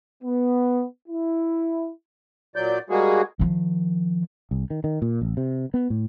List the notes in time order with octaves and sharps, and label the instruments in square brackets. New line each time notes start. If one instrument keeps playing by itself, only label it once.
[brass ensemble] B3
E4
[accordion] A#2 F#3 D5 G6
G3 G#3 A#3 F#4 G#4
[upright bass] D#3 F3
[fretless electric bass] C2
D#3
D#3
A#2
A1
C3
B3
A2